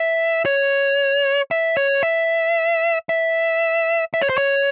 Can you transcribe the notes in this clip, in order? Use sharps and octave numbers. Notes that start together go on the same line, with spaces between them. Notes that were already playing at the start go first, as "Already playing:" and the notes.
Already playing: E5
C#5
E5
C#5
E5
E5
E5
C#5
C5
C#5